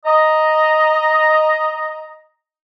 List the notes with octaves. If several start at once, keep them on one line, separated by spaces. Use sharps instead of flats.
D#5 A#5